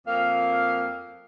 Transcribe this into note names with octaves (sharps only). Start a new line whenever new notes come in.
F2 A#3 F5